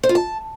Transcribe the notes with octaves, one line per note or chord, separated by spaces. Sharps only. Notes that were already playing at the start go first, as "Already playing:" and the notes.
C5
F4
A5